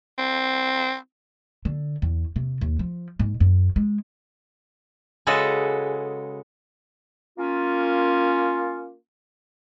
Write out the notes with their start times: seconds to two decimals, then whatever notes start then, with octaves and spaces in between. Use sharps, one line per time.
0.18 C4
1.65 D3
2.02 E2
2.36 C3
2.61 D#2
2.79 F3
3.19 G#2
3.40 F#2
3.76 G#3
5.27 C#3 G#3 F#4 G#4 A4 B4
7.39 A#3 C#4 F4